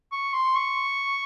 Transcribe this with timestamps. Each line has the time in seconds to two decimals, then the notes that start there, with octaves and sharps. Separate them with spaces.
0.12 C#6
0.33 C6
0.55 C#6